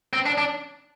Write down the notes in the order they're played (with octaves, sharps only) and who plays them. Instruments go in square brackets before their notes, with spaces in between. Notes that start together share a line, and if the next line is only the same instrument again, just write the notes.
[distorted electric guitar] C4
D4
D4